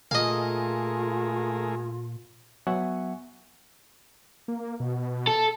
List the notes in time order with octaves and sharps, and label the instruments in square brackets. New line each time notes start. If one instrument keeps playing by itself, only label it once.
[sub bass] A#2 [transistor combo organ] A3 G#4 A#4 [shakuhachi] F4 [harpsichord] D#5 F5
[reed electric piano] F#3 B3 E5 F#5 G#5 C#6
[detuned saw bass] A#3
B2
[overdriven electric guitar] A4